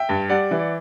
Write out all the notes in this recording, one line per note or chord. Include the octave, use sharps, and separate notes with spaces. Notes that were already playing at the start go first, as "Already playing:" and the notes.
Already playing: E5 G5
G2
G3 D5 F#5
E3
D5